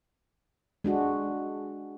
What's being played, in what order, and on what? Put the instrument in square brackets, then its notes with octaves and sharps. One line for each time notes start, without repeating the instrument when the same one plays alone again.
[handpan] G#3 D4 F#4